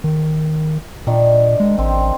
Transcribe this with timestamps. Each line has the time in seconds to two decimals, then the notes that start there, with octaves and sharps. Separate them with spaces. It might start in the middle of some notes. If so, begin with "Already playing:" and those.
0.04 D#3
1.07 A#2 D#3 D4
1.60 G#3
1.78 A1 C4